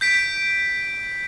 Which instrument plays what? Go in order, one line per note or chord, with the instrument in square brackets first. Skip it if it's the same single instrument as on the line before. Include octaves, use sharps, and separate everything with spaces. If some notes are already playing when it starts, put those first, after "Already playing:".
[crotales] G6 B6 D7